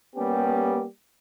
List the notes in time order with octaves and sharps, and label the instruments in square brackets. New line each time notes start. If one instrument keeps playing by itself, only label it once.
[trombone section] G3 A#3 B3 C#4 G4